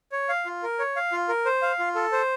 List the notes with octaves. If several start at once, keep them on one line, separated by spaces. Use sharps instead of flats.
C#5
F5
F4
A#4
C#5
F5
F4
A#4
C5
F5
F4
A4
C5